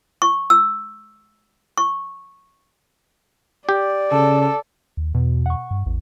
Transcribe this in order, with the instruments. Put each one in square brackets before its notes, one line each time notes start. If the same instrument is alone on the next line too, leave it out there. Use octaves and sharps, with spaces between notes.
[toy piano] C#6
E6
C#6
[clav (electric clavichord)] G4 [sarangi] D5
[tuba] C#3 [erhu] A4
[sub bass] D#2
[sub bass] E2 [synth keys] B2
[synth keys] F#5 C#6
[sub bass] G2
[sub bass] A1 [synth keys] E2